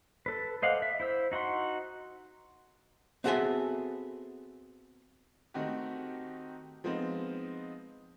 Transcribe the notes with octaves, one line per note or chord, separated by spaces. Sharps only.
A4 B4
C5 D#5 F5 F#5 D6
E5
E4 C5 E6
D#4 F#4 F#5 C6
B3 C4 F#4 G#4 A4 E5
D#3 A3 C4 D#4 F#4 G4
F3 G#3 B3 C4 D#4 F4